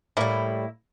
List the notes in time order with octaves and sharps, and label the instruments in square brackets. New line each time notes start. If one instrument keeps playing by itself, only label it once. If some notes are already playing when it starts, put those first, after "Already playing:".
[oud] A2 G3 [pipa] A#3 E4